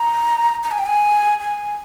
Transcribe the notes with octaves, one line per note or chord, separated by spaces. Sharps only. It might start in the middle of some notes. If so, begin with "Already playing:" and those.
Already playing: A#5
A#5
G#5
G5
G#5
G#5